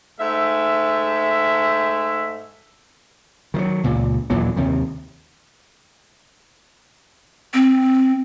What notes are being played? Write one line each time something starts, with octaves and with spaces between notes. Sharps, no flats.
G#2 A3 E5
D#3 E3 F#3
C#2 A#2
D#2 A#2 E3 F#3
D#2 C3 D#3
C4